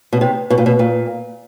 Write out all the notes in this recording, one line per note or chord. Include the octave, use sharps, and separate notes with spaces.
B2
C3
B2
A#2
B2
A#2